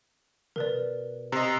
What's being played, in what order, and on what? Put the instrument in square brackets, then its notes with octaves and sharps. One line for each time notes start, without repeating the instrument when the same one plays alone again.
[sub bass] B2 [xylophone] A#4 B4 D5
[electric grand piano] C3 D#5 [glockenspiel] A#5 C7